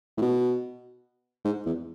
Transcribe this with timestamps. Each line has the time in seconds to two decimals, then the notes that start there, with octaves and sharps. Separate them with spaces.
0.17 A2
0.22 B2
1.45 G#2
1.66 E2